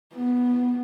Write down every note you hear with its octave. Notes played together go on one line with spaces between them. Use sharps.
B3